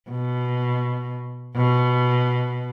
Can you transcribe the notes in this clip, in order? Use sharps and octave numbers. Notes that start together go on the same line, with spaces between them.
B2
B2